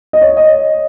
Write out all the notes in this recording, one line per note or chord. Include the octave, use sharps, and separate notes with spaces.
D#5
C#5
D#5